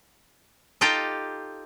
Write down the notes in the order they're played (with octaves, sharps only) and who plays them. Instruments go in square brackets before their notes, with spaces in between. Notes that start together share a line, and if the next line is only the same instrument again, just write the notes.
[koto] D#4 F4 G4 A4 G5